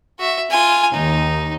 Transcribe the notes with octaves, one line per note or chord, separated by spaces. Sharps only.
F#4 E5
F4 G#5
D#2 D#4